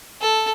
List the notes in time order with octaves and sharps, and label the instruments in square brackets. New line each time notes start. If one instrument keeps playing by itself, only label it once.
[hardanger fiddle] A4